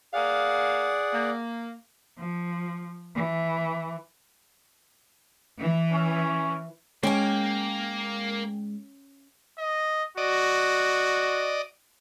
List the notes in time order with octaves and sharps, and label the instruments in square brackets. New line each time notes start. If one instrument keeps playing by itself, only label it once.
[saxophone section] A#3 F5 [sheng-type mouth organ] G#4 D5 F#5
[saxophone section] A#3
[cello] F3
E3
[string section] E3
[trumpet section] C#4
[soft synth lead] G#3 [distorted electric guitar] A#3 [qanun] C#4 [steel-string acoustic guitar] G5 G#5
[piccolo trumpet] D#5
[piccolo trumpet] F#4 [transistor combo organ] D5 D#5